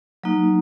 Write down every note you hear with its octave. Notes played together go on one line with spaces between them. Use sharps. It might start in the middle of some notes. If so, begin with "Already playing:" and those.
F#3 A#3 D#4